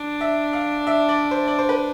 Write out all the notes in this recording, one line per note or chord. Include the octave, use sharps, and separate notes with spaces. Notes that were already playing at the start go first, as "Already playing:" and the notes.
Already playing: D4
E5
F5
E5
D5
C5
D5
C5
B4